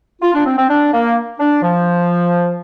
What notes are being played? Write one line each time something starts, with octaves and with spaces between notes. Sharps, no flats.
F4
D4
C4
C4
D4
A#3
D4
F3